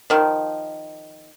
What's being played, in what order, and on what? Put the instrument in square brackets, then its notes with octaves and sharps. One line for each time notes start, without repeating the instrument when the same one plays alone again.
[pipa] D#3 F3